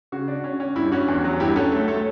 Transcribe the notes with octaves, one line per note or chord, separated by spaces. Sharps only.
C#3 F#4
D4
C#4
C#4
G2 E4
C#4 F#4
E2
F#3
G2 E4 G4
C#4 F#4 A4
A3
A3 A4 C#5